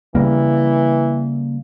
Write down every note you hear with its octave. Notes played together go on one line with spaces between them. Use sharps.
C#3 E3 G3 A#3